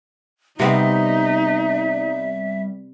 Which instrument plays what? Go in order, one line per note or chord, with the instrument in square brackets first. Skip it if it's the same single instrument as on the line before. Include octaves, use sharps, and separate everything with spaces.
[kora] C3 B3 C4 [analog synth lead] G3 [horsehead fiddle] D#4 [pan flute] E5